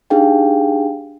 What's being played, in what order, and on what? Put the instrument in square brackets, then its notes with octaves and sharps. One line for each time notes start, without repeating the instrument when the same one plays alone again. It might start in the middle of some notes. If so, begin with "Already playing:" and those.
[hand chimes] D4 D#4 G4 G#4 F5 G5